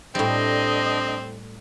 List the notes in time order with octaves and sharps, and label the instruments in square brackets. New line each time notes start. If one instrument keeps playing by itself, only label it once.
[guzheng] A2 G3 [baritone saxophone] C4 [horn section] D4 D#5